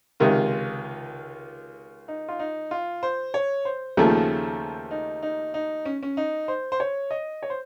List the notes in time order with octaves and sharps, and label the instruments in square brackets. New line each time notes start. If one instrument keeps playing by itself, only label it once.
[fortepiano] C#2 C3 D#3 [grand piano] F4
[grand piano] D#4
F4
D#4
F4
C5
C#5
C5
[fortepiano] D#2 C#3 F3 A3
[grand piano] D#4
D#4
D#4
C#4
C#4
D#4
C5
C5
C#5
D#5
C#5
C5